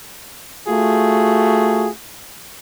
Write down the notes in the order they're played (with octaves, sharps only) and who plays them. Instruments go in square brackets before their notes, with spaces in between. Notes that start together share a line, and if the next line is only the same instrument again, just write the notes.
[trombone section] A3 F4 F#4 G#4